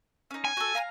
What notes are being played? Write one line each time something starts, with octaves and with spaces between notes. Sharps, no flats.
C#4 D#4
G#5
F#4 A4
F5 A#5 F6